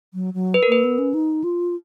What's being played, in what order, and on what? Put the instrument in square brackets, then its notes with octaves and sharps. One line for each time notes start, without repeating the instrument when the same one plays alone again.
[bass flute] F#3
F#3
[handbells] B4
A#4
[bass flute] A#3 [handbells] B4
[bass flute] B3
C#4
D#4
F4